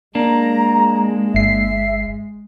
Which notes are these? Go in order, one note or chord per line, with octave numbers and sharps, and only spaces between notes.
G#3 A#3 D4 A#5
G1 E5 C7